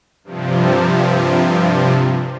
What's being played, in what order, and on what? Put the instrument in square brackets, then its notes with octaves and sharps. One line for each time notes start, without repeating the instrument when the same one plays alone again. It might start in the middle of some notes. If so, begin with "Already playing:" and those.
[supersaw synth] G2 C3 F3